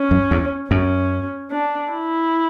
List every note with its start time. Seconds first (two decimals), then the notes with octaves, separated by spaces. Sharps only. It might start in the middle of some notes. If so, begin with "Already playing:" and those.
Already playing: C#4
0.11 F#2
0.31 E2
0.71 F#2 C#4
1.51 D4
1.91 E4